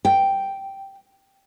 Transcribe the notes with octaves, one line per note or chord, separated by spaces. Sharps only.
G5